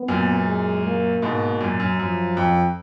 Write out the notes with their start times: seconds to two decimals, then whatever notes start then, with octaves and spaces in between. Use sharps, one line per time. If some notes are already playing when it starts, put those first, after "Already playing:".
Already playing: B3
0.08 F#2 A#2
0.47 G#3
0.85 A#3
1.22 G#2 B2 A#3
1.61 F#2 A#2
1.80 F#2
1.99 F#2 F3
2.37 F2